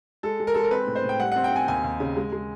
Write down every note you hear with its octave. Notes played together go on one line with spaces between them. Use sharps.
G#3 A4
G#3
A#4
G#3 A4
A#4
C4 B4
A2
C5
A2
G5
G3 F#5
C4 F#5
G5
C4 G#5
D#2 G#5
D#2
C#3
G#3
G#3